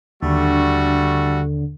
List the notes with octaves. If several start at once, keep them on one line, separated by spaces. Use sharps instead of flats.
D#2 D3 G3 A3 F#4